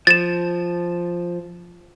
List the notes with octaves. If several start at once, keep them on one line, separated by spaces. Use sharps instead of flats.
F3 A6 E7